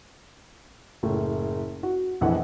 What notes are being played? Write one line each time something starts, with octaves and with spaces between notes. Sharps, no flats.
F#1 A2
F#4
A#1 F2 E3 F#5